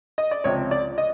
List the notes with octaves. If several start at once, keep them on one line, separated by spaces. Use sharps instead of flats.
D#5
D5
C#2 C3 F3 C#5
D5
D#5